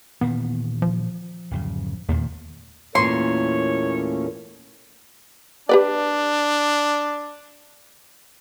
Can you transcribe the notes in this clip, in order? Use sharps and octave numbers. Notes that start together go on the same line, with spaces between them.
A#2 D#3 E3 B3
F3
D1 F#2 C#3
E2 A#2 D#3 A3
E2 A#2 A3 A#3 C#4 C#5 C6
D4 G4 B4 D5